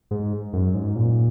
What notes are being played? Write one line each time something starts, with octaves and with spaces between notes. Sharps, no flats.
G#2
F#2
G#2
A#2